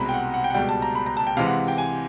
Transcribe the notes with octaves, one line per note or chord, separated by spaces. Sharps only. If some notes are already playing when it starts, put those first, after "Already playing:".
Already playing: C2 B2 G#3 C4 A#5 B5
G5
F#5
F#5
G5
F#5
C#2 B2 G3 G5
A5
A#5
B5
A#5
A5
G5
C3 E3 G#3 F5
F#5
G5
G#5